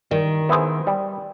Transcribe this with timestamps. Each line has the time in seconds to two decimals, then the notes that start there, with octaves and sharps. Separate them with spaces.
0.11 D#3 G3
0.49 B3 E4 G#4 C5
0.87 G3